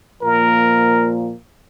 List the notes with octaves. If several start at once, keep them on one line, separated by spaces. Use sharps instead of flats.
A#2 F3 A#3 A#4